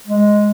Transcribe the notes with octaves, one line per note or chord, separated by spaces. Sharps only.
G#3